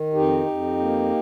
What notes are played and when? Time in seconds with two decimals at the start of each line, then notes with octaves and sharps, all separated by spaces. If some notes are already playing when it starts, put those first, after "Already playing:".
Already playing: D#3
0.14 F2 D#4 G4
0.47 F2
0.79 A#3